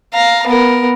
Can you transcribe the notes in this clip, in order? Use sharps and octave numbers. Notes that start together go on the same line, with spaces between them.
F5 A#5
B3 A#4